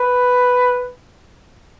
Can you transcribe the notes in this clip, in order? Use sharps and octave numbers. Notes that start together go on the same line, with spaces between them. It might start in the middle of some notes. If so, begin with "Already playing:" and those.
Already playing: B4